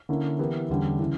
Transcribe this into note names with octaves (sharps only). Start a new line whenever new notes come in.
D3 A#3 C#4 E4
E3 B3 E4 G4 A#4
E2 D3 G3 C#4
C#3 E3